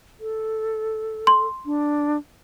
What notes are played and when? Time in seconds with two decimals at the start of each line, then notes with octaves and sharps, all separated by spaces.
0.20 A4
1.27 C6
1.66 D4